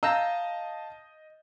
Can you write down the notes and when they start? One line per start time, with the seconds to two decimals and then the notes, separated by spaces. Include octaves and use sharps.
0.03 D#5 F5 A5 A#5 E6 G6